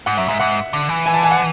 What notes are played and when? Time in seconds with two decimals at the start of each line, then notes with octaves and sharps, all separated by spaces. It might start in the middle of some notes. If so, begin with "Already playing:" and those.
0.06 G#2 F#5
0.17 F#2 E5
0.28 G#2 E5
0.40 G#2 F#5
0.73 D3
0.89 E3
1.06 G#5
1.14 A5
1.23 G#5
1.31 F#5